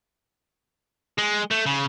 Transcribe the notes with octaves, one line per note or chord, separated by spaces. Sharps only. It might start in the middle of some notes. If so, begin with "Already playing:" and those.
G#3
A3
C#3